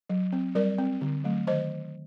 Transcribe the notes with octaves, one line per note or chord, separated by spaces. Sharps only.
F#3
C4
G3 A#4 D5
C4
D3
F#3 A3
D#3 C5 D#5